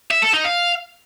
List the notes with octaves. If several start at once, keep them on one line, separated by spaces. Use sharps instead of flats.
E5
A4
D#4
F5